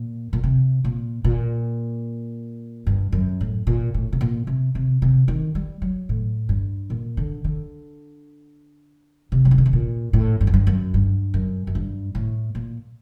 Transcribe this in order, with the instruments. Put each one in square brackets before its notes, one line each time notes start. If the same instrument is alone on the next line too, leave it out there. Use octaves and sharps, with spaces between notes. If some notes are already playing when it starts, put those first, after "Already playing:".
Already playing: [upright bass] A#2
A#2
C3
A#2
A#2
G2
F#2
A2
A#2
A2
C3
A#2
C3
C3
C3
D#3
G3
F#3
A2
G2
A#2
D3
D3
C3
F#3
D#3
D3
C3
A#2
A2
G2
F#2
G2
F#2
G2
F#2
F#2
G2
A2
A#2